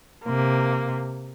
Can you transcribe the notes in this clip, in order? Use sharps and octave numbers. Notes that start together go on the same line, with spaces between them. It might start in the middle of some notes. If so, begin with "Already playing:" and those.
C3 A#3